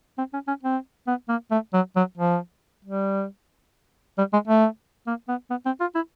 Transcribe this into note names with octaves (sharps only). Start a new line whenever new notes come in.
C4
C#4
C#4
C4
B3
A#3
A3
F#3
F#3
F3
G3
G3
G#3
A3
A#3
B3
B3
C4
F4
E4